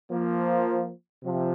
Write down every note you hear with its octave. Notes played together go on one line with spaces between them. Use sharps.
F3 A#3
C3 F3